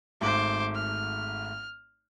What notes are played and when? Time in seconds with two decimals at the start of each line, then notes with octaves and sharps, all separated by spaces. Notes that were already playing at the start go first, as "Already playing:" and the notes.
0.21 G#1 G#2 A3 C5 D6
0.75 F6